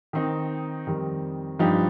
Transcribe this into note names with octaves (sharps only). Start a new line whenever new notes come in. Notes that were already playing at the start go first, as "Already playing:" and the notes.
D#3 C4 D#4
F2 D#3 G3 C4
G2 F3 D#4 G4